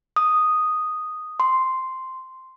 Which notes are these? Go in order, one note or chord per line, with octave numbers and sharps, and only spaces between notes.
D#6
C6